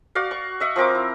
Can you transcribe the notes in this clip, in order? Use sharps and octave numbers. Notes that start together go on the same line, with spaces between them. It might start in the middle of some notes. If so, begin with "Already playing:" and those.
F#4 D5 F5
C#6
D#5 E5 F#5
F3 C4 A#4 D6
E4